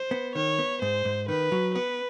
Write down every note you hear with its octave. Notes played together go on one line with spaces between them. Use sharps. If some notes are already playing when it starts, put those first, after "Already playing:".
Already playing: C5
B3
D#3 C#5
B3
G#2 C5
G#2
D#3 B4
F#3
B3 B4